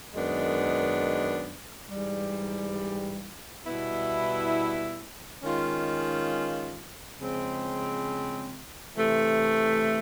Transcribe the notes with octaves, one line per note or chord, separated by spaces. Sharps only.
F#2 D#3 G#3 B3 D4
G#2 E3 G3
B2 G3 B3 E4
D#3 G#3 C#4 F4
C#3 F3 G#3 C4
C3 E3 A3